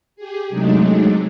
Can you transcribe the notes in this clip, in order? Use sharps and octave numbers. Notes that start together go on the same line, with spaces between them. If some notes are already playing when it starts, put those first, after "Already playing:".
G4 G#4
C3 F#3 G#3 A3 D4 D#4